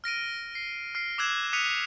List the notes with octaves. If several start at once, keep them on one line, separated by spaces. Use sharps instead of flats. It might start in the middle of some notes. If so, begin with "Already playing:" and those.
F6 A#6 D7 D#7
C7
F6 C7 D7
D6 E6 F#6 G#6 E7
D#6 F#6 B6 C#7 D#7 F7